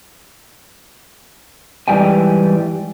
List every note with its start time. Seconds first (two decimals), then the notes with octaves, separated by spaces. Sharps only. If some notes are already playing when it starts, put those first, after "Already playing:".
1.88 G#2 E3 G3 G5 G#5